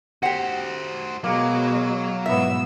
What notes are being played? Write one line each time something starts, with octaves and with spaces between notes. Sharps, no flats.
F#4 G4 C5 F#5
B2 F#3 G#3 A#3
G#2 B2 B3 E4 E5 E6